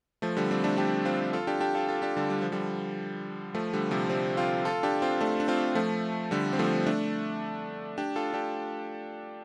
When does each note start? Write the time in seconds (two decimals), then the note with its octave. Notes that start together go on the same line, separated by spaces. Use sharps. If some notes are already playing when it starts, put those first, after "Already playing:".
0.22 F3 A3
0.37 D3 G3
0.51 G3 C4
0.64 A3 D4
0.78 D4 G4
1.05 C4 F4
1.33 F4 A4
1.47 D4 G4
1.60 D4 G4
1.75 F4 A4
1.89 F4 A4
2.02 D4 G4
2.17 D3 G3
2.30 G3
2.42 F3
2.52 D3 G3
3.54 F3 A3
3.73 D3 G3
3.91 C3 F3
4.10 G3 C4
4.37 C4 F4
4.65 F4 A4
4.83 D4 G4
5.02 C4 F4
5.20 A3 D4
5.40 D4
5.48 C4 F4
5.75 F3 A3
6.31 D3 G3
6.53 C4
6.59 F3 A3
6.87 A3 D4
7.98 D4 G4
8.16 F4 A4
8.34 D4 G4